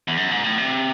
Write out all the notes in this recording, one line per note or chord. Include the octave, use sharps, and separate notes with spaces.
E2
F#2
G#2
A2
C3